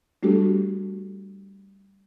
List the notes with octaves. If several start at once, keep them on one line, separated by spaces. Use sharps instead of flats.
G3 A3 D4 F#4 G4 A4